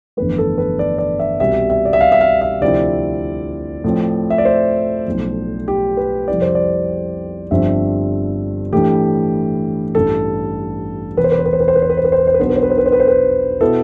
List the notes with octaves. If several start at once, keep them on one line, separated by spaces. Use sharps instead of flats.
G1 F2 E3 A3 B4
A4
B4
D5
D5
E5
C2 B2 G3 E5
E5
D5
E5
F5
E5
F5
E5
D2 C3 F3 C4 E4 D5
A2 F3 C4
E5
D5
C5
B1 A2 F3
G4
B4
F2 C3 G3 C4 E4 D5
C5
D5
G1 G2 F3 C4 E5
A2 E3 A3 D4 G4
A1 G2 E3 A4
E1 E2 C3 B4
C5
B4
C5
B4
C5
B4
C5
B4
C5
B4
C5
B4
C5
B4
C5
B4
B1 B2 B3 D4 C5
B4
C5
B4
C5
B4
C5
B4
C5
B4
B2 B3 E4 A4